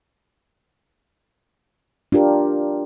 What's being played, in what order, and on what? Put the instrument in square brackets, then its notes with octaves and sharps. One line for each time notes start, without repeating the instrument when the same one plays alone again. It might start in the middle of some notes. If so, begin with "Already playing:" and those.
[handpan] D4 F4 G4 A#4